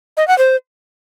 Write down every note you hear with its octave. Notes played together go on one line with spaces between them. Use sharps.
D#5
F#5
C5